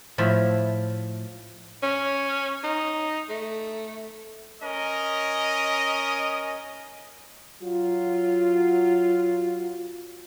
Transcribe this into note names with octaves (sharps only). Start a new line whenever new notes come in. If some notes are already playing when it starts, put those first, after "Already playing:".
A2 F3 E5
C#4
D#4
A3
C#4 A#4 D#5
F#3 F4